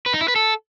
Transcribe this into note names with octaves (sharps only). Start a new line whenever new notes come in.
B4
D#4
E4
B4
A4